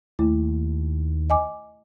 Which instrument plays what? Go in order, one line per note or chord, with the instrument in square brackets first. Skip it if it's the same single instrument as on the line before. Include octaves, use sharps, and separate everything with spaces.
[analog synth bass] D#2 [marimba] A3 E4
[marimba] D#5 G#5 D6